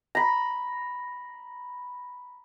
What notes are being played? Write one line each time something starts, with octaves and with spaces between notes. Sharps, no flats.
A#5 B5